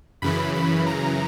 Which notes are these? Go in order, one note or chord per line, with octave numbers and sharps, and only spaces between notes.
F#2 C#3 E3 B5
B5
A#5